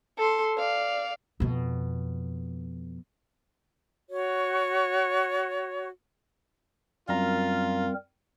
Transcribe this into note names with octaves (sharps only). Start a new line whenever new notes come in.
A4 C6
D5 F5
F2 B2
F#4 C#5
F#2 G3 C4 F4 A#4 A#5